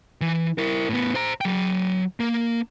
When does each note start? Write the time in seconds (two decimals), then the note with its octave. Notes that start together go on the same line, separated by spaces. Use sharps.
0.21 E3
0.58 E4 A#4
0.89 A2 B3
1.15 C5 A#5
1.41 F#3 G5
2.20 A#3